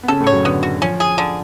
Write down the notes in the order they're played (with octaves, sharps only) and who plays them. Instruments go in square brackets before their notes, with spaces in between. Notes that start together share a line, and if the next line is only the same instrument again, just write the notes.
[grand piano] B3
[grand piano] C#3 C#4 [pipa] A4
[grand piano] A2 A3
[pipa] C#5
[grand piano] F#2 F#3
[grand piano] D3 [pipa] B3
[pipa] F#4
[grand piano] F3 [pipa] C#4
[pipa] G#4
D3